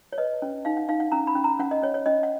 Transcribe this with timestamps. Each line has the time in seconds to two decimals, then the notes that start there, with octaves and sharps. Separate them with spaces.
0.13 C#5
0.18 B4 D#5
0.42 C#4
0.65 D#4 F5
0.77 F#5
0.89 D#4 F5
1.00 F#5
1.12 C#4 A#5
1.27 B5
1.35 C#4
1.44 A#5
1.59 C#4 F#5
1.71 D#5
1.82 C#4 C#5
1.94 C#5
2.06 C#4 D#5
2.23 F#5